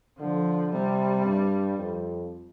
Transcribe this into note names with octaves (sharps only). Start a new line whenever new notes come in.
D3 F3
C3 G3
G2
F2